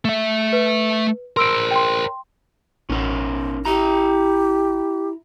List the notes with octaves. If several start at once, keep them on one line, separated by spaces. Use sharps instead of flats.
A3 E5
B4
A#4 C5 C6 E6 D7
G5 C6
A1 C#4 D#4 A#4
E4 G4 A#5